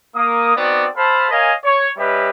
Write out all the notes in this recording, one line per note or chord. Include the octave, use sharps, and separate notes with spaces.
A#3 D#6
B3 C4 D#4 F#4 D5
A4 C5 F5 A5 B5
A#4 C#5 D#5 F5 G#5
C#5
G3 C#4 G4 B4 D#5 E5